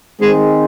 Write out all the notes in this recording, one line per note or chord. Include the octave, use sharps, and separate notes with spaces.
D#3 G#3 C4 D#4 G#4 C5